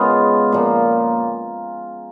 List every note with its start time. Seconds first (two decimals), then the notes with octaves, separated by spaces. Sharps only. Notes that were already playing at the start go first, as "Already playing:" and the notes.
Already playing: C#3 G#3 B3 F4 G#4
0.52 A#2 F3 A#3